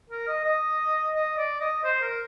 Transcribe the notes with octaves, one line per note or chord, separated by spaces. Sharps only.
A#4
D#5
D#5
D#5
D5
D#5
C5
A#4